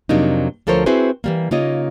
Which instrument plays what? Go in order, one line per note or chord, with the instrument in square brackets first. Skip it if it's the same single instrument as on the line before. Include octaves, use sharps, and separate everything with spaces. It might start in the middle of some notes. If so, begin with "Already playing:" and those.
[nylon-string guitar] F2 C3 F#3 A#3 D4 D#4
D2 F3 A4 A#4 C5 C#5
C4 E4 F#4 G#4 B4 C5
E3 G3 A#3
C#3 A#3 D#4 F4 C#5 D#5